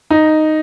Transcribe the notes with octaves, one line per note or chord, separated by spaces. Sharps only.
D#4